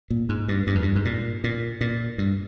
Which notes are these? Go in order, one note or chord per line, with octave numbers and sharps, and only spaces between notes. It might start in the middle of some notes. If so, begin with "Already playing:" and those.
A#2
G#2
G2
G2
F2
G2
G#2
A#2
A#2
A#2
G2